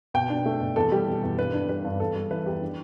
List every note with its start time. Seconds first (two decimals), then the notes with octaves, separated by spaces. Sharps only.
0.14 B2 G5
0.30 D4
0.46 A3
0.61 B2
0.76 E2 A4
0.92 G3 G4
1.07 B2
1.23 E2
1.38 G2 B4
1.54 D4
1.69 G3 B4
1.85 G2
2.00 E2 A4
2.15 G3
2.31 E3 B4
2.46 E2 G4
2.62 D4